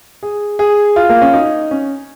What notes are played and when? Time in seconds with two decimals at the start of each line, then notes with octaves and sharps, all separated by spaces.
0.23 G#4
0.59 G#4
0.96 F4
1.09 A#3
1.22 C#4
1.34 D#4
1.71 C#4